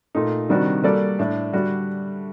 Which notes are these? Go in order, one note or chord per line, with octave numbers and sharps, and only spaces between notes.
A#2 A3 D#4
C3 D#3 G3 D4 F#4
G3 A#3 F#4 A4 D5
A2 A3 D4
D3 G3 D4 F#4